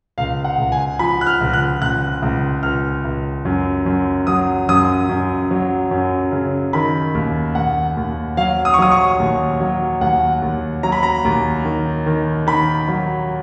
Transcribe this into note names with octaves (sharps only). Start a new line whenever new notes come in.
C#2 F5
F#5
C#2
G#5
F3 B5
F#6
F6
C#2
F#6
C#2 F#6
C#2
C#2 F6
C#2
F#2
F#2
F#3 D#6
F#2 D#6
F#2
F#3
F#2
C#3
D#3 B5
D#2
D#2 F#5
D#2
F#3 F5
D#6
C#6
F#3 D#6
C#6
D#2
F#3
D#2 F#5
D#2
F#3 A#5
B5
A#5
D#2
D#3
D#3
D#3 B5
F#3